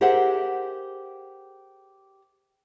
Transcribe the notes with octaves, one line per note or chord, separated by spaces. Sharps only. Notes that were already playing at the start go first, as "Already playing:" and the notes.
G4 G#4 A#4 C5 E5 F#5